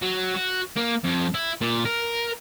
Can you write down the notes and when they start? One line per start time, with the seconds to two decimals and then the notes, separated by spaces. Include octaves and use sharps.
0.02 F#3
0.35 F#4
0.77 A#3
1.04 F2
1.34 E4
1.61 A#2
1.85 A#4